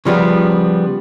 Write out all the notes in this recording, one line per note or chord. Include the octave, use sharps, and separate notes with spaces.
C#3 F3 G3 B3